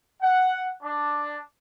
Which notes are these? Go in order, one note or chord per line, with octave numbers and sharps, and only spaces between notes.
F#5
D4